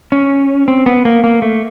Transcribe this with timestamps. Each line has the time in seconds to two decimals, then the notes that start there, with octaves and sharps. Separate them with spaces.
0.12 C#4
0.68 C4
0.86 B3
1.05 A#3
1.24 A#3
1.42 A3